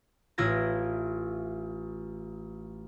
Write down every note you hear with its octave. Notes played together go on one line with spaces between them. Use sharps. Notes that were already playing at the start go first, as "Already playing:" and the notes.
A1 E4 F4 G#6 A#6